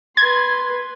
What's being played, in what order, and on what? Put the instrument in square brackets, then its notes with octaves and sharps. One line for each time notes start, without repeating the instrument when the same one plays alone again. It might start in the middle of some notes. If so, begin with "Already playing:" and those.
[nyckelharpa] B4 C6 [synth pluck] G#6